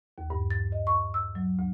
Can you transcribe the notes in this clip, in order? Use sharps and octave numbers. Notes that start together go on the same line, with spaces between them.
D#2
G2
A6
D#5
C#6
E6
F#3
D2